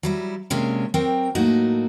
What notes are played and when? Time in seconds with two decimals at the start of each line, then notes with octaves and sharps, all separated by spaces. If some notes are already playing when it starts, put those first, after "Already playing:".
0.03 F#3 G3 E4
0.50 C3 G#3 A#3 C#4 D4
0.94 F#3 C4 A#4 G5
1.35 A2 F#3 A3 A#3 D#4 F#4